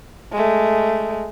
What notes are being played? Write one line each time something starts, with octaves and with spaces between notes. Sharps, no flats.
G#3 A3